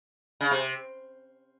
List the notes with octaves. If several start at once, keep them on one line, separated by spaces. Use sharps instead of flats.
C#3
C3